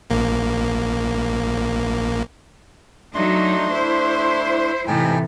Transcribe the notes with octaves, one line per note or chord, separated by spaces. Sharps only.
A#1 A#3
F#3 A3 D4 D#4 C6
E4 C5
A2 C3 E3 D#4 G5 G#5